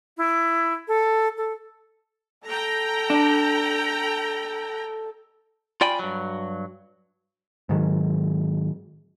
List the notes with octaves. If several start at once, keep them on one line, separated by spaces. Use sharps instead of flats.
E4
A4
A4
A4 G5 A#5
D4
F4 D5 G5 G#5 B5
G2 F#3
G#2 D#3 F#3